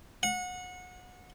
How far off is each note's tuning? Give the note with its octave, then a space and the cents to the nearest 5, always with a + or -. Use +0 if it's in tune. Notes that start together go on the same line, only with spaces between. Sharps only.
F#5 -25